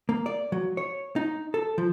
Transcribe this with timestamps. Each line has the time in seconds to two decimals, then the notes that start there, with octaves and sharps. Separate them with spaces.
0.09 A#3
0.26 D5
0.52 F#3
0.77 C#5
1.16 D#4
1.54 A4
1.78 F3